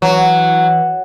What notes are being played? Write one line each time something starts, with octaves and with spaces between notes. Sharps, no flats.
E3 F#3